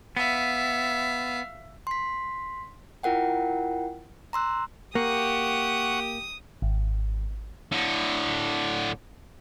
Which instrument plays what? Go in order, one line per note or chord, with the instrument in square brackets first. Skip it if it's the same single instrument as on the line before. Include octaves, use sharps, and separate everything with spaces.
[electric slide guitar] B3 [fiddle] E5 F5
[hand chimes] C6 B6
E4 F4 A#4 F#5 G5
A#5 C6 E6 F#6
[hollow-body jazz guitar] A#3 [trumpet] G4 [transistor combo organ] F#5 C#6 [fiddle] D#6
[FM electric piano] G#1
[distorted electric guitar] A2 D3